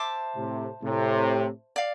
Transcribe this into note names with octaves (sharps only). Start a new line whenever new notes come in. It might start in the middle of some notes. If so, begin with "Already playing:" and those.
Already playing: C5 E5 A5 D6
A2 C3
A2 C3
D5 F5